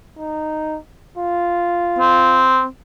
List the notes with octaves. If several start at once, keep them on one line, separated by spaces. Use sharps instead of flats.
D#4
F4
C4